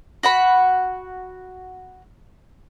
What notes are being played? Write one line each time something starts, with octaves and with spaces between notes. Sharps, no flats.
F#4 F#5 B5